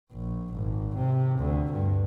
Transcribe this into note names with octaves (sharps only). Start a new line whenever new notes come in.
A#1
G#1
C3
D2
G2